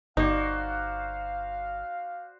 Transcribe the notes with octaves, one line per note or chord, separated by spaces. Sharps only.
G1 D#4 F#4 C5 D5 F5